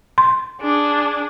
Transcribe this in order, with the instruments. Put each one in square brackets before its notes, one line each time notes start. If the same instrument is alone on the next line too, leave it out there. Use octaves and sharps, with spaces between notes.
[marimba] C6
[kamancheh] D4 G#4